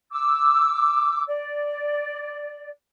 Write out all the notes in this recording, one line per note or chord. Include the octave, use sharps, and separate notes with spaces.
D6 E6
D5